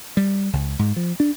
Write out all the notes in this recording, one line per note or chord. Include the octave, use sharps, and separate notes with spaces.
G3
C#2
G#2
F3
D4